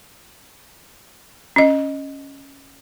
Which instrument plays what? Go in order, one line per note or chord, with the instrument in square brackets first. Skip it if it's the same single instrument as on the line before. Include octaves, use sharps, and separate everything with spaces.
[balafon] C#4 D#5